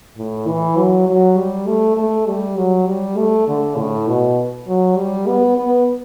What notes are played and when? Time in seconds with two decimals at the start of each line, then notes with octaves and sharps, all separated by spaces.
0.18 A2
0.47 E3
0.77 F#3
1.07 F#3
1.38 G3
1.67 A3
1.97 A3
2.27 G3
2.57 F#3
2.87 G3
3.17 A3
3.48 D3
3.77 A2
4.07 B2
4.68 F#3
4.97 G3
5.27 B3
5.57 B3